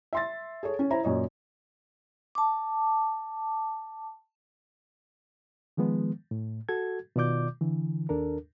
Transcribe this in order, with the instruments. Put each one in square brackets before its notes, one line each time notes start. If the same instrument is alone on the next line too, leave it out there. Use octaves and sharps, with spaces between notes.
[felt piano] E5 C6 A6
G#4 A4 C#5
C#4
E4 C5 A#5
F#2 A#2 C#5 D#5
[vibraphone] A5 D6
[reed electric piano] D#3 F3 G#3 B3
A2
F#4 A4 G#6
B2 D#3 F4 D5 D6 G6
D3 E3
D#2 D4 A4 A#4